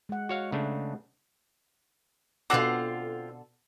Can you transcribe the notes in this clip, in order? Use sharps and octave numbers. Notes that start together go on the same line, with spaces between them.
G#3 F#5
F#4 C#5 F5
C#3 A3 D4
B2 D3 C4 F4 F#4 A4 F#5 D6